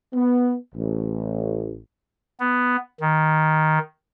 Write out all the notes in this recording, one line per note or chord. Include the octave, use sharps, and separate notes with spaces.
B3
A1
B3
D#3